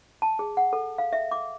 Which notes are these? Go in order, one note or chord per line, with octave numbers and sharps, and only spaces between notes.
A5
G#4
F#5
A4
F5
E5
D6